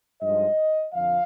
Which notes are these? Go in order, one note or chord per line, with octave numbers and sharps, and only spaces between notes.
G2 F3 G#3 D#4 D#5
F2 D3 F3 F5